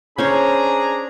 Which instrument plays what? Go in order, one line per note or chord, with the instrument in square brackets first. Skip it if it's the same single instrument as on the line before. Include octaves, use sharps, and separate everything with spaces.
[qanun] C#4 C5 C#5 [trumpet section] D4 G#4 A#5